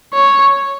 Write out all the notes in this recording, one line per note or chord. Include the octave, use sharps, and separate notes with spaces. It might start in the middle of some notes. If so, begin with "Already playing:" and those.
C#5